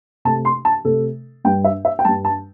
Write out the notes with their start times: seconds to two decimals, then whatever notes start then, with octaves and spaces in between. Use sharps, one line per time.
0.25 C3 A3 A5
0.45 C6
0.65 A5
0.85 C3 A3 A4
1.44 G2 G3 G5
1.64 E5
1.85 E5
1.99 G5
2.05 G2 G3 A5
2.25 A5